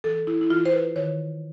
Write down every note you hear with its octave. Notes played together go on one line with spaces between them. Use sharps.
E3 A4
E4
E4
E3 F4
C5
B4
D#3 C#5